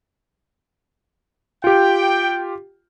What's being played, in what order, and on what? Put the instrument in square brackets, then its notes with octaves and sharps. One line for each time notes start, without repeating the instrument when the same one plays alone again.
[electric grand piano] F4 G4 [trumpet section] G5